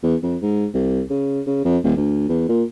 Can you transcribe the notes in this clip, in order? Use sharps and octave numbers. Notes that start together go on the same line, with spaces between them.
E2
F2
G#2
C2
C#3
C#3
F2
D#1
D2
E2
A#2